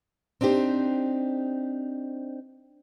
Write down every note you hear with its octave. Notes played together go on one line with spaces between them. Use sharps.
C4 D4 D#4 G4 C5